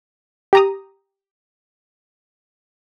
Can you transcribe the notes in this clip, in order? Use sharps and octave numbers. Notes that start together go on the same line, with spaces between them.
G4 A#5 D#6